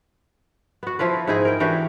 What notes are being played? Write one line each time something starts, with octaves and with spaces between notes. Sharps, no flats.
B3 F#4
F3 E4 F4 B4
G#2 D#4 E4 G#4
A#4 G5
E3 D4 F#4 G4